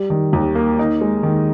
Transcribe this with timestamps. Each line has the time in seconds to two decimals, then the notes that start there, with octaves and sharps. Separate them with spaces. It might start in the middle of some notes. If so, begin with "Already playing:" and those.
Already playing: G3
0.10 D#3
0.33 D#2
0.55 A#3
0.79 D#4
1.01 G#3
1.23 D#3